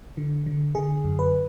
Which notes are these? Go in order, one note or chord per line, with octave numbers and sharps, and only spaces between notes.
D3
D3
D3 G#4
F#2
B4